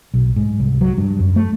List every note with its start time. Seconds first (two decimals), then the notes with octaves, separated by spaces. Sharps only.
0.14 B1
0.36 G#2
0.60 C2
0.81 F#3
0.97 G2
1.20 F#2
1.36 A3